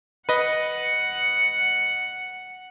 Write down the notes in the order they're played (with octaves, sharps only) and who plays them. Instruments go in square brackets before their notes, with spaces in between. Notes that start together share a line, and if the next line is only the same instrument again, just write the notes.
[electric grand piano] B4 D#5 [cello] F#5